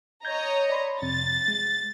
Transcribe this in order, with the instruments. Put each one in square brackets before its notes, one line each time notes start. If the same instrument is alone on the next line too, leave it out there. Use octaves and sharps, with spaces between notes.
[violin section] C#5 D#5 A#5 [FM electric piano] G6 G#6
[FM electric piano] D5 B5 C6
[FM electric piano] F2 C3 [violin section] A6
[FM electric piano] G#3